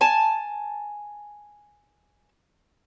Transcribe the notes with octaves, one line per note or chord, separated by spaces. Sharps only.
G#5 A5